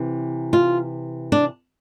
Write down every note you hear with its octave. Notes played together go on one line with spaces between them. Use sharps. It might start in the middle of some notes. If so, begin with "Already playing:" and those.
Already playing: C3 E3
F4
D4